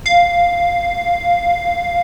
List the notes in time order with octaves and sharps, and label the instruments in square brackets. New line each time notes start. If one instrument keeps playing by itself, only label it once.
[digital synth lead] F5